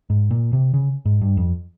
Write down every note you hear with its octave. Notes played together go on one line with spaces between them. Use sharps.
G#2
A#2
C3
C#3
G#2
G2
F2